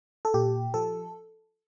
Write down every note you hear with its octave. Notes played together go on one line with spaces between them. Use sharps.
A4
A#2 G4
F3 A4